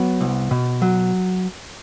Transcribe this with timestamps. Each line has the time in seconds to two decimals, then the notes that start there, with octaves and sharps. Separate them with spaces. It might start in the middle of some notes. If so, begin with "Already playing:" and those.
Already playing: F#3 B3
0.21 C2
0.51 B2
0.82 F#3